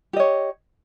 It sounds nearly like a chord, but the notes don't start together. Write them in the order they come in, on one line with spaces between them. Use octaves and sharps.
G4 D#5 C#5